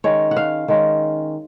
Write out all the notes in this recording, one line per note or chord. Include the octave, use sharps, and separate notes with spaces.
D#3 G#3 C#4 C#5
F#5
F5
D#3 G#3 C#4